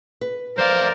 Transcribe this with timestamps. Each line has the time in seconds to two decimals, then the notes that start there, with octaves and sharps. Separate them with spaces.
0.21 B4
0.58 F2 A3 A#4 C5 D5 F5